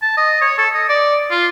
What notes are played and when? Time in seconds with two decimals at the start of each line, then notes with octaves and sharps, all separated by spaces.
0.02 A5
0.17 D#5
0.42 C#5
0.58 A4
0.75 D#5
0.89 D5
1.31 F4